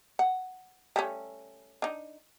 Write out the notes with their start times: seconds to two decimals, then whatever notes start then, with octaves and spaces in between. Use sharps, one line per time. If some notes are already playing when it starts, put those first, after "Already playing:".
0.19 F#5
0.96 G3 A3 C#4
1.82 D4 D#4